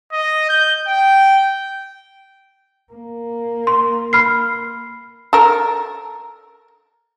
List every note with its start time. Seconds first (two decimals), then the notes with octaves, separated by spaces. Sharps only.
0.13 D#5
0.49 G6
0.87 G5
2.92 A#3
3.67 C6
4.13 B5 F6 C7
5.33 A4 A#4